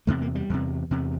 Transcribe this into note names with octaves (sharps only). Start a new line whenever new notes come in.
E2 C3 A3
A#3
G3
E2 C3
E2 C3